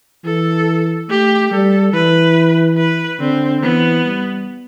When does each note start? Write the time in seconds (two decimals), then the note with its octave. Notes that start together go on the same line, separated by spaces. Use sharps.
0.24 E3 A4
1.09 A3 G4
1.51 G3 A4
1.93 E3 B4
2.77 B4
3.19 D3 C4
3.62 E3 B3
4.04 G3